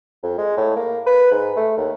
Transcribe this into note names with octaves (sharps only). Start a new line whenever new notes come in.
F2
G#3
A2
A#3
B4
G#2
A3
D#2